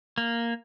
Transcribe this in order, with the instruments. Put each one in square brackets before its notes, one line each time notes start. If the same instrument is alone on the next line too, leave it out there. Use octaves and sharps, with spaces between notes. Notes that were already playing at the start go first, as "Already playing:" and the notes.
[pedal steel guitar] A#3